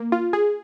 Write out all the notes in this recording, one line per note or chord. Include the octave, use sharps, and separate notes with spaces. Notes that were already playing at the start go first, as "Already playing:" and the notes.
Already playing: A#3
F4
G#4